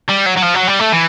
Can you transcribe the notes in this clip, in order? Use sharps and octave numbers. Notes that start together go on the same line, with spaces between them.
G3
F#3
F#3
F3
F#3
G3
A3
E3